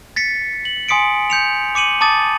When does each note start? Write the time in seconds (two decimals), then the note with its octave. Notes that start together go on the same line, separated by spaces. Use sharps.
0.16 A6 B6 C#7
0.65 F#7
0.88 G#5 C6 D#6 B6 C#7 D7
1.30 G6 C#7 F7
1.75 D6 C#7 D#7 F#7
2.01 A5 D6 D#6 A6